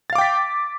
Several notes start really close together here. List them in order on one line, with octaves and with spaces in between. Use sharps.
A6 F5 D6 G5 B6